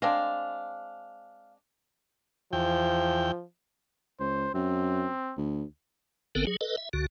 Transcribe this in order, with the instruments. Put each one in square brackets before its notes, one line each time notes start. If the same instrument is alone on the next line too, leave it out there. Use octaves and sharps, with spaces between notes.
[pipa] G#3 C4 D4 [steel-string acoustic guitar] F5
[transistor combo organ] E2 G5 [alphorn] F3
[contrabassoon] C#2 [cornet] C5
[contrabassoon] F#2 [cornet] C4
[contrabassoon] D2
[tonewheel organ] G#1 D3 B3 C4 A4 A#4
F#3 G#4
A4 B4 D#5
E5
C#2 D3 F#4